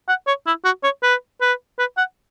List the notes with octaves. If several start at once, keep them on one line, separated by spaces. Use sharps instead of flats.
F#5
C#5
E4
F#4
C#5
B4
B4
B4
F#5